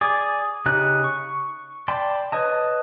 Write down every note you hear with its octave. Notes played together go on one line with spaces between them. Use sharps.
G#4 D5
C#3 D#4 G4 C#5 F#6
C#6
D5 G5 A5 B5 C6
B4 C#5 D#5 A5